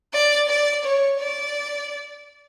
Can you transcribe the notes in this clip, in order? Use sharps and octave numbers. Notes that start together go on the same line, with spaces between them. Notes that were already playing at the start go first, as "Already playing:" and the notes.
D5
D5
C#5
D5